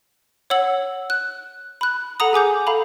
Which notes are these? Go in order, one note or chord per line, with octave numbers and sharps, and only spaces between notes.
C#5 F#5 E6 F#7
F#6
B5 F#6
A4 F#5 A#5 D#6
G#4 G#5 D6 G6
A4 F5 A#5 B5